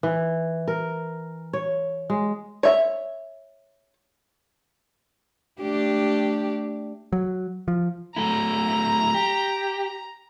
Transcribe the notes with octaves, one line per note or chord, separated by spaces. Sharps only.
E3
A#4
C#5
G#3
C#5 E5
A3 D4 G4
F#3
F3
F#3 A3 E4 A#5
G4